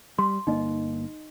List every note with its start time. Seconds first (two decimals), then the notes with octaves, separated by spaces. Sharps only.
0.18 G3 C6
0.47 G1 A#3 D#4 D#5